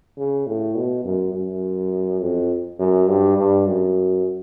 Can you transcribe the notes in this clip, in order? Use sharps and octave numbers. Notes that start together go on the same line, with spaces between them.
C#3
A2
B2
F#2
F#2
F2
F#2
G2
G2
F#2